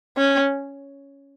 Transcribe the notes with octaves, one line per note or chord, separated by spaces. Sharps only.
C#4